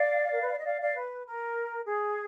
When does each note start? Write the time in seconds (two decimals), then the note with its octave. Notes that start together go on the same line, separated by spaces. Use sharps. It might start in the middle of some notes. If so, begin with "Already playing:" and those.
Already playing: D5 F5
0.32 A#4
0.41 B4
0.49 D5
0.58 D#5
0.66 D5 F5
0.81 D5 F5
0.96 B4
1.26 A#4
1.87 G#4